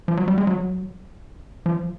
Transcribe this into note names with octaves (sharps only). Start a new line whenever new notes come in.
F3
F#3
G3
G#3
F#3
F3